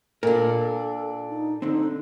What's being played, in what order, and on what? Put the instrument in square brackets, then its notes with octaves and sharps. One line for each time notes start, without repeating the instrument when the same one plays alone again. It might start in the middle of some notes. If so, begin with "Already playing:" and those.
[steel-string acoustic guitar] A#2 D4 [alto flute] A4 [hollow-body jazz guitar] A#4 B5
[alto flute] D#4
[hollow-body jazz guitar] D3 C4 [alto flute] D#4